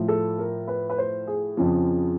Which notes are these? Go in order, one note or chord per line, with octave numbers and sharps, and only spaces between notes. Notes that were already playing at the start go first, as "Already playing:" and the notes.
Already playing: A2 F3
A4
A#4
B4
B4
C5
G#4
F2 C#3 F3